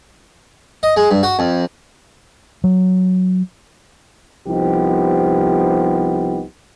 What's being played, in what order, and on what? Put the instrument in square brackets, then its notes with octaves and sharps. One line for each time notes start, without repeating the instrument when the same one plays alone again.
[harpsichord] D#5
G#3
G2
F#4
F2
[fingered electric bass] F#3
[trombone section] C2 F3 B3 D#4 G4